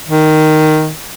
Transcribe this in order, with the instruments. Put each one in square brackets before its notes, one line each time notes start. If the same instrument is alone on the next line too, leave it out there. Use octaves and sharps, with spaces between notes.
[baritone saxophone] D#3